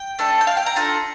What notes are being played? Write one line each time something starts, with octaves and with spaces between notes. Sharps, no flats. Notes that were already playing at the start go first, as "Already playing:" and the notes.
Already playing: G5
A3 D4 A4
G5
F5
G5
A#5
D4 F4 A4